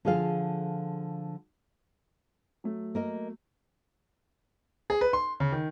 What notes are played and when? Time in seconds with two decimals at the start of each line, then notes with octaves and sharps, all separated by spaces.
0.05 D3 F3 F4 G#4 A4 F5
2.64 F#3 A3
2.95 A#3 A#4 D#5
4.90 G#4
5.01 B4
5.13 C6
5.40 C#3
5.52 D#3